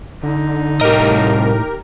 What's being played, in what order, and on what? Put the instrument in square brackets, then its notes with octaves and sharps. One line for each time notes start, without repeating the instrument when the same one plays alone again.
[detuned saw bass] D3 [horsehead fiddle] D#4
[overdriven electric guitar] C2 D#5 [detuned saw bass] A2 [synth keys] G4 A#4